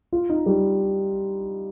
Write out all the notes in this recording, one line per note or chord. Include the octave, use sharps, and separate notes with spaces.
F4
D#4
G3